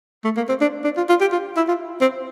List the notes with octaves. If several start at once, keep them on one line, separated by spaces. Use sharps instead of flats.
A3
A#3
C4
D4
D4
F4
F4
G4
F4
E4
F4
C4